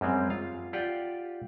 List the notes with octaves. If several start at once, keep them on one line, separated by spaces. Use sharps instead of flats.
F#2 G3 G#3 C4
F4 F5
F4 G4 D5 F#5 G5